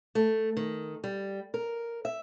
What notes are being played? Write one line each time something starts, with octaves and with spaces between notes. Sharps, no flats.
A3
D#3
G3
A#4
E5